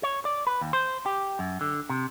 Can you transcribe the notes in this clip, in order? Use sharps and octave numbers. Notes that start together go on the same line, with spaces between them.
C#5
D5
B4
D#2
C5
G4
F#2
D3
C3